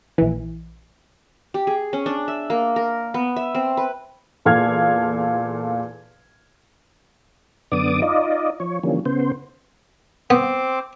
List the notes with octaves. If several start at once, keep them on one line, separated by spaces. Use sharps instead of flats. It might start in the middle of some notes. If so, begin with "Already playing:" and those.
A#1 E3
G4
G#4
C#4
D4
E5
A#3
A#4
B3
E5
C4
B4
E2 A#2 A4 F5 F6 G#6
F#2 D3 B3 D5 D6 D#6
D#4 F4 D5 D#5
F3 C#5
D3 E3 F3 G3 A#3 C#4
C#3 B3 C5
B3 C4 C5 D6